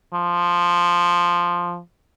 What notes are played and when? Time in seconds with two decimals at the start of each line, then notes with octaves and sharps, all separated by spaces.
0.13 F3